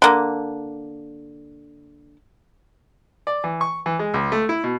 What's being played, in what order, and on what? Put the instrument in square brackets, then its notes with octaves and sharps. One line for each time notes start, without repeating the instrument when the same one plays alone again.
[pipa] D3 A#3
[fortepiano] D5
E3
C#6
E3
G#3
C#2
A3
E4
B2